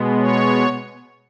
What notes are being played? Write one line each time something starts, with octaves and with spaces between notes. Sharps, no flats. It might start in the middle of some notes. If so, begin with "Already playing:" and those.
Already playing: B2 G#3 B3
C#5